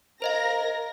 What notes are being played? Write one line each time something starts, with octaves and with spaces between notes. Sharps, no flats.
A#4 C5 D#5 F5 A#6